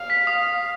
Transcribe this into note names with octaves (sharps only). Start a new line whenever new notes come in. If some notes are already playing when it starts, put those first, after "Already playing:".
Already playing: F5
B6
D#6